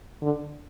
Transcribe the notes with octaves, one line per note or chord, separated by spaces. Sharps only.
D3